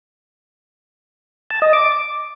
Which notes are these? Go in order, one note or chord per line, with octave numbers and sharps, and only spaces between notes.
A5
D#5
D6